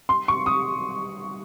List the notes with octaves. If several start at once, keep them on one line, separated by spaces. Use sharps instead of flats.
C6
C#6
D#6